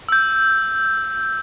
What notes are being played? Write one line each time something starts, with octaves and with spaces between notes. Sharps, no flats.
E6 G6